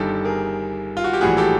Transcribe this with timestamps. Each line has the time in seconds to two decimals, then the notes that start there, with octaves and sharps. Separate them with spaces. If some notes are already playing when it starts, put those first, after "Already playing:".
Already playing: G1 G2 D#3 G4 A4
0.25 G#4 A#4
0.97 F4
1.04 F#4
1.13 G4
1.21 A#1 A2 E3 G3 F#4 G#4
1.37 G4 A4